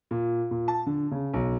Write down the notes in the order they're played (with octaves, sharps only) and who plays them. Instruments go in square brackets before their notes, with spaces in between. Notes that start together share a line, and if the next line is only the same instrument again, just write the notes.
[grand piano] A#2
A#2
A5
D3
C#3
B1